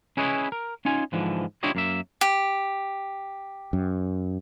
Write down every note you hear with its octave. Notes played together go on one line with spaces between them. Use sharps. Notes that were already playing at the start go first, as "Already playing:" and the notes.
C#4 E4 G#4 B4 C#5 D#5
A#4
C#4 D#4 F4 G#5
G#2 D3 E3 F3
D4 E4 F4 G4 C#5 D#5
F#2 A#3 E5
G4
F#2